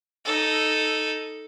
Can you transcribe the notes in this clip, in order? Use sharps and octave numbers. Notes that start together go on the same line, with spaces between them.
D#4 A4